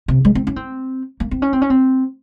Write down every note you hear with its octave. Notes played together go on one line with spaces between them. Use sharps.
C3
G#3
C4
C#4
C4
A#3
C4
C#4
C4
C#4
C4